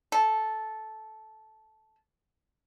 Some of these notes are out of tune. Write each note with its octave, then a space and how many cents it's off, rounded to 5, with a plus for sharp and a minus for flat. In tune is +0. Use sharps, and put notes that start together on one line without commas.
A4 -10